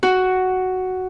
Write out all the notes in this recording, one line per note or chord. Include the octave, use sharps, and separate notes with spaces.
F#4